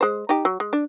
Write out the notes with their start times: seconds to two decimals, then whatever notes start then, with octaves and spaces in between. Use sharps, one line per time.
0.01 G#3 C5
0.29 D#4 G4
0.45 F#3
0.60 G#3
0.73 D4